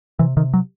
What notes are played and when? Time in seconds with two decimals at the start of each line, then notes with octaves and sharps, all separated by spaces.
0.19 C3 E3
0.37 C3 D#3
0.54 F#3